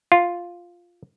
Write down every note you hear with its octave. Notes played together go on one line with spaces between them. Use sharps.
F4